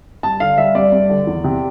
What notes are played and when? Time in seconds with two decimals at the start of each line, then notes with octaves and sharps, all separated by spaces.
0.23 G2 A5
0.40 D3 F5
0.58 G3 E5
0.75 G2 D5
0.92 G2
1.10 D3
1.27 E2
1.44 C3